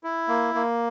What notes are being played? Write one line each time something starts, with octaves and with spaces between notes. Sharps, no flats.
E4
A#3
A#3